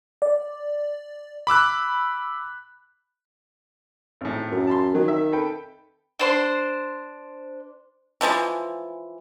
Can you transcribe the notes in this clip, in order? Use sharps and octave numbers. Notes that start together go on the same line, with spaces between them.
D5
B5 D6 E6 F#6
G#1 A2
F#2
A5 B5 C6
D#3 F#3
D#3 E5
A4 B4 G5
D4 C5 C6
E3 F3 G3 G#3